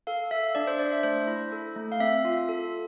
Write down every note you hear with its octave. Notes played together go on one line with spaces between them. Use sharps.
A4 F5
A4 E5
D4 D5
C5
D4 D5
E5
A3 C5
E4
A4
A3
F5
C4 E5
F4
A4